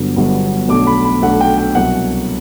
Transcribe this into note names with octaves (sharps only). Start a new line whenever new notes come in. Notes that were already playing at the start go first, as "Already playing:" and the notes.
Already playing: G1 G2 D3 F#3 B3
G1 G2 D3 F#3 B3
B1 B2 A3 D4 D6
B5
B5
B1 B2 A3 D4 F#5
G5
G5
C2 B2 F#3 F#5